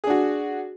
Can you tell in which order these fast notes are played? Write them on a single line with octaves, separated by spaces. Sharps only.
G#4 D4 F#4